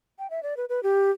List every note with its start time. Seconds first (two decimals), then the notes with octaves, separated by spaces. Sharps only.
0.19 G5
0.30 E5
0.43 D5
0.57 B4
0.69 B4
0.83 G4